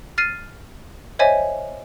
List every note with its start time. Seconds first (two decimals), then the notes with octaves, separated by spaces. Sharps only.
0.18 F6 A6 C7 D#7
1.19 C5 C#5 D#5 E5 G#5